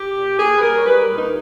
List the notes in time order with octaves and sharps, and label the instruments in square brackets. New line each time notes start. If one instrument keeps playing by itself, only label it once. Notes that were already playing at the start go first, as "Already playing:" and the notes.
Already playing: [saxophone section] G4
A#2
A#3 G#4
B4
G3 A#4
C#5
G3 B4
A#4
A#2
D#4